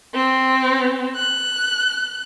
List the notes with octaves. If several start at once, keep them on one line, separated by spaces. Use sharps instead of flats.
C4
F#6